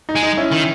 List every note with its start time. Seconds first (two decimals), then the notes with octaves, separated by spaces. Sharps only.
0.09 D#4
0.15 G#3
0.23 D#4
0.37 C#4 E4
0.52 D#3